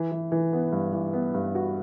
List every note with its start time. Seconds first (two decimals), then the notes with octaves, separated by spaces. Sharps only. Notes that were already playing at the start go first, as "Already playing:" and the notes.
Already playing: E3
0.12 E3
0.32 E3
0.53 B3
0.72 G2
0.93 E3
1.13 B3
1.34 G2
1.55 F#4